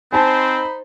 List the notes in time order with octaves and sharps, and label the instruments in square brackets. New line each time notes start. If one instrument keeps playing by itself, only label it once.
[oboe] C4 [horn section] D#4 B5 [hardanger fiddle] C5 [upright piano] G#5 A5